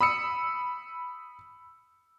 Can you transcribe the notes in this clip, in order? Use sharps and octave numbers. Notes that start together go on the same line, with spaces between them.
B5 D#6 E6 C#7